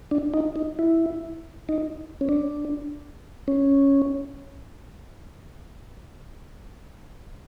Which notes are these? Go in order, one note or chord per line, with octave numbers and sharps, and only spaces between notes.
D4
D#4
D#4
E4
D#4
C#4
D4
C#4